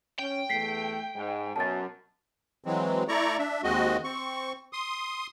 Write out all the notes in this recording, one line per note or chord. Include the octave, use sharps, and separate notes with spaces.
C#4 G5
E2 A3 B6 C7
G#2 G#3
F#2 B2 A5 A6
E3 F#3 G#3 C4
A3 E4 D5 A#5 C#6
D4 E5
D#2 G#3 C4 F#4 D#5
C4 C#6
C6 D#6